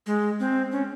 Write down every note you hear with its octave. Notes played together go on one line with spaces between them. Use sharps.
G#3
C4
C#4